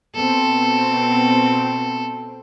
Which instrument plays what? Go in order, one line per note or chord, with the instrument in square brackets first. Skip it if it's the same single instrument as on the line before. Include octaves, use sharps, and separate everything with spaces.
[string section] B2 C4 [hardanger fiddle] A4